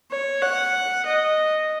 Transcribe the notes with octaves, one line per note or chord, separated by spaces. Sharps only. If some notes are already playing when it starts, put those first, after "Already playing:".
C#5
F#5
D#5